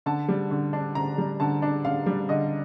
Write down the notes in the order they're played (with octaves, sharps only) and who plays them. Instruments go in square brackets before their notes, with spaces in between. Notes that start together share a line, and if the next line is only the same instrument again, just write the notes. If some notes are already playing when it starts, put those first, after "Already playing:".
[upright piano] D3 A5
G3
D3
D4
D3 A#5
G3
D3 A5
D4
D3 F5
G3
D3 D#5